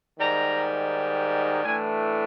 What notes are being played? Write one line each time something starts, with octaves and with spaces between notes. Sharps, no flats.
G#2 D#3 G3 A#5
A2 E3 A3 D4 G#5